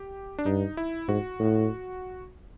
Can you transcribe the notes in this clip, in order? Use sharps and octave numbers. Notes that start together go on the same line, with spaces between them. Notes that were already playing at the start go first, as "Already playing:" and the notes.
Already playing: G4
D4
G2 D#4
E4
G#2 F#4
A2